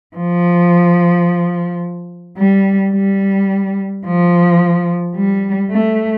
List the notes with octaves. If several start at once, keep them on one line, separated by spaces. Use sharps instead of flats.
F3
G3
G3
F3
G3
A3